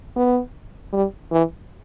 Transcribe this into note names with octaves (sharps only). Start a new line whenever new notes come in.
B3
G3
E3